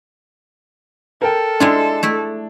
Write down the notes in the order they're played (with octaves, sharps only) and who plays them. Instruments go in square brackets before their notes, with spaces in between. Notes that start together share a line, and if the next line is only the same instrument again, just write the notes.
[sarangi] A4 [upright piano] A#4 G5
[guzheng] G#3 E4 F4 [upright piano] D4
[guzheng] A3 E4